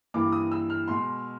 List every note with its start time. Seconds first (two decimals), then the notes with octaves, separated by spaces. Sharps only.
0.14 G2 E3 G3 A#3 D6
0.32 D#6
0.51 E6
0.70 F6
0.88 B2 G#3 C6